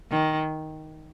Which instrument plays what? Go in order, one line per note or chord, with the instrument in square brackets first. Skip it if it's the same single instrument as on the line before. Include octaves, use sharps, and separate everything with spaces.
[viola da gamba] D#3